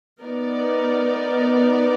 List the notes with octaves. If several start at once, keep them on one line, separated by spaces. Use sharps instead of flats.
B3 D#4 A#4 D5